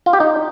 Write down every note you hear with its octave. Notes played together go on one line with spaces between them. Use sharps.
F4
G4
D#4